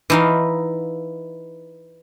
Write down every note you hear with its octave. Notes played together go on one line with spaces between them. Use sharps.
E3 D#4 F5